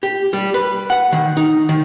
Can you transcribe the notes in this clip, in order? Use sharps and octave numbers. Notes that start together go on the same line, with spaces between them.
G4
G3
B4
F#5
D#3
D#4
D#3